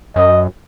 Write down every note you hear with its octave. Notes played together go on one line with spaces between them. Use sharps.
F#2 D#5